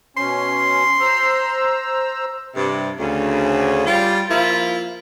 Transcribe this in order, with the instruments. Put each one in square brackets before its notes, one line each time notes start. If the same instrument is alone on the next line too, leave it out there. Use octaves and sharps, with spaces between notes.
[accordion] B2 C#4 [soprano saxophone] C6
[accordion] C5 A#5 E6
[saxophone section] G2 C3
D2 C#3
G3 F4
F3 A#3 E4 F4